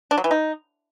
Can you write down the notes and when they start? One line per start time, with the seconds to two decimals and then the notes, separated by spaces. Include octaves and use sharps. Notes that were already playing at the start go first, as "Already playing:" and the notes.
0.11 D4
0.18 F#3
0.24 E3
0.31 D#4